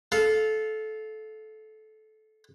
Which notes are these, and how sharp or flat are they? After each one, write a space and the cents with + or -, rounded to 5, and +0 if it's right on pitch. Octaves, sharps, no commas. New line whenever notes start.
A4 -20 F5 +0